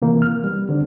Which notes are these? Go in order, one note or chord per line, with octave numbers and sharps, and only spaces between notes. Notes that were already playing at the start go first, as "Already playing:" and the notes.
C3 E3 A#3
F6
G3 B3
D3 C4 D4